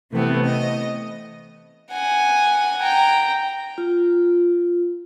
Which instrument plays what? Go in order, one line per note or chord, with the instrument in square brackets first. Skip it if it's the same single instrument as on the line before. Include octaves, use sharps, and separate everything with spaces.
[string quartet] C3 E3 A3 B3 C4
D#5
[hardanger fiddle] F#5 G#5
G5 A#5
[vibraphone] F4